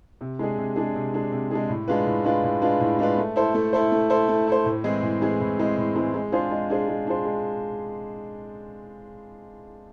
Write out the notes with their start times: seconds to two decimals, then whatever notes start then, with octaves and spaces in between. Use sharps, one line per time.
0.21 C3
0.39 G#3 D4 G#4
0.58 C3
0.76 G#3 D4 G#4
0.95 C3
1.13 G#3 D4 G#4
1.32 C3
1.51 G#3 D4 G#4
1.69 A2
1.88 G#3 D4 F4 B4
2.06 A2
2.25 G#3 D4 F4 B4
2.44 A2
2.62 G#3 D4 F4 B4
2.80 A2
2.99 G#3 D4 F4 B4
3.18 A3
3.36 E4 A4 C5
3.54 A3
3.73 E4 A4 C5
3.92 A3
4.10 E4 A4 C5
4.29 A3
4.47 E4 A4 C5
4.65 A2
4.84 E3 G#3 C4 G#4
5.03 A2
5.21 E3 G#3 C4 G#4
5.40 A2
5.59 E3 G#3 C4 G#4
5.77 A2
5.96 E3 G#3 C4 G#4
6.14 G#3
6.32 D4 F4 G#4 C5
6.51 G#3
6.70 D4 F4 G#4 C5
6.88 G#3
7.07 D4 F4 G#4 C5
7.25 G#3